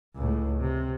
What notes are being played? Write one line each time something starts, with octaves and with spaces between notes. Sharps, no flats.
C#2 A2
C3